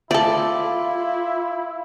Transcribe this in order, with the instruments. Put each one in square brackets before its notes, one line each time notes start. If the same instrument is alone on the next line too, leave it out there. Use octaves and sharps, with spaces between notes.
[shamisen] A3 A4 [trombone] E4 [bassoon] F4 [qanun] D5